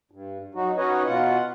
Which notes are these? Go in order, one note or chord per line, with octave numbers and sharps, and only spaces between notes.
G2
F#3 D#4 F#4
C#4 D#4 F#4 B4 C#5 D#5
B2 F4 F#5